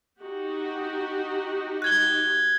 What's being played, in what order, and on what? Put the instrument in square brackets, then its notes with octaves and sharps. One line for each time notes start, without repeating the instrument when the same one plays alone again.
[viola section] D#4 F#4 G4
[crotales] F#6 G#6 G7